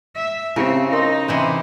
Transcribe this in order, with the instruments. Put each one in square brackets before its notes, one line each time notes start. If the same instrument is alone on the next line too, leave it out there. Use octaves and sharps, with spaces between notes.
[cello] E5
[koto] C#3 [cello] C4 [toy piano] E4 G4 F5
[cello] D#4 [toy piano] A#4 C6
[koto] C3 E3 C5